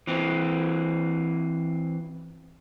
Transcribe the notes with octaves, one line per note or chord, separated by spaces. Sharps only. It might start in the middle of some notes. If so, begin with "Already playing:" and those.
E3 C4